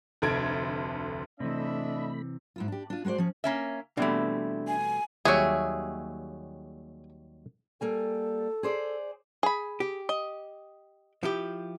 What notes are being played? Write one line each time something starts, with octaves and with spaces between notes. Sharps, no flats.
F1 D2 A4 G#6 D7
C3 E3 A3 D4 D#5 E5 B5
G#2 E4 F4
D4 G4
D4 F4
G#3 F#4 A#4 C5 D5
F3 C#4
A#3 C#4 E5
B2 E3 G3 A3 C4 D4 E5 G#6
G#5
D#2 F#3 G3 G#4 C#5 E5
G3 A#3 A4 G#5
G#4 C5 D5
G#4 B5
G4
D#5
F3 E4 G4